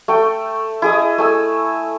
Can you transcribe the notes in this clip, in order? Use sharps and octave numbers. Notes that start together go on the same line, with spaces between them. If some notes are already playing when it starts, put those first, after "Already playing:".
A3 G5
E4 G#4 D#5
A3 G#5 E6